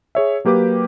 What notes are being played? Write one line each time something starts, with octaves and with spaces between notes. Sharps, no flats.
G#4 C#5 E5
F#3 A#3 G4 B4 D6